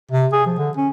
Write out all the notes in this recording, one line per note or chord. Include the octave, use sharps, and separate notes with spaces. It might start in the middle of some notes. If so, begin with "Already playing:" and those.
C3
G#4
F3
D3
C#4